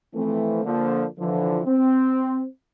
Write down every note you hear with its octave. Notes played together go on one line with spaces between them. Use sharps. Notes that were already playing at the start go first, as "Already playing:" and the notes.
E3 F3 A3 C4
D3 F3 A#3
D3 E3 F3
C4